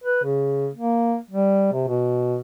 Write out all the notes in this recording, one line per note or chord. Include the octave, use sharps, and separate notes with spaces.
B4
C#3
A#3
G3
C3
B2